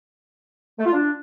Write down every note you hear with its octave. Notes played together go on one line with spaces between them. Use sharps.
A3
F4
D4